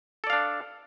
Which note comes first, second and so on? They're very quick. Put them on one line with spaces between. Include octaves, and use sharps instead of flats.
A4 D5 F5 D4